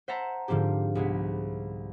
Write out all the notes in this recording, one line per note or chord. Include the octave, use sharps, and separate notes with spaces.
C5 E5 F#5 A5 A#5
G#2 D3 F3 C4 G4
C2 G#3 B3